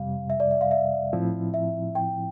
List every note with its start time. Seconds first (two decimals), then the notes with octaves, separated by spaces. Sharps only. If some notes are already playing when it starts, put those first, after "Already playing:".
Already playing: F2 C3 G3 F5
0.30 E5
0.40 D5
0.51 E5
0.61 F5
0.71 E5
1.13 A2 F3 C4 E4
1.54 E5
1.95 G5